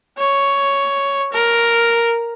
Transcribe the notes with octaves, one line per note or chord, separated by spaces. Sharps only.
C#5
A#4